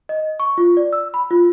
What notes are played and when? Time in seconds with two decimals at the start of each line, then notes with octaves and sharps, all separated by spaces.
0.09 D#5
0.40 C#6
0.58 F4
0.77 D5
0.93 E6
1.14 B5
1.31 F4